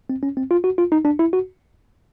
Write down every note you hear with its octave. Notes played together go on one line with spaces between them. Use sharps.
C4
C#4
C4
F4
F#4
F4
D#4
D4
E4
F#4